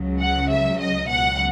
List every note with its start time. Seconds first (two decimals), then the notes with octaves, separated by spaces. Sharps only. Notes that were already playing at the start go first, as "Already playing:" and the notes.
Already playing: C#2 C#3 F#3
0.19 F#5
0.49 E5
0.79 D#5
1.07 C#2 B2 F#3 F#5